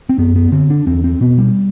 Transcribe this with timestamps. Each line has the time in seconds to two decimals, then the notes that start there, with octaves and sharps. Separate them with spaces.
0.09 C4
0.18 F#2 B3
0.36 B3
0.52 D3 C4
0.70 D4
0.87 E2 C4
1.04 C4
1.21 B2 B3
1.38 G3